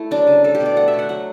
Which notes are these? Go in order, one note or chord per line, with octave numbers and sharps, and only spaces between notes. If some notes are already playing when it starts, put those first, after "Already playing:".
Already playing: A3 E4
F#3 D4
C#3
G3 A4
G4
B2
D5
A3 F#5
E5
A3
F#5
F#3 F#5